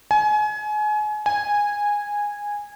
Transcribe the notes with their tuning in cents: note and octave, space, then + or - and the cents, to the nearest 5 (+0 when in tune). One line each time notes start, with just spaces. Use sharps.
G#5 +30
G#5 -10